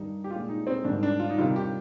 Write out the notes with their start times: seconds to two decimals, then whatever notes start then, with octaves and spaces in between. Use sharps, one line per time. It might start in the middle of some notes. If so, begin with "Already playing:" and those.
Already playing: G2 D#3 G3 D#4
0.24 G4
0.31 G#3 F4
0.36 A#2
0.49 D#4
0.67 C4
0.84 G#2 D#3 G3 D4
1.03 D4
1.20 F4
1.30 D#4
1.38 C3 D#3 G3 F4
1.56 G4